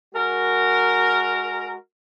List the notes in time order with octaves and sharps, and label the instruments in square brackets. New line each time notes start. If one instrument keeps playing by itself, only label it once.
[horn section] G#3 F#4 A#4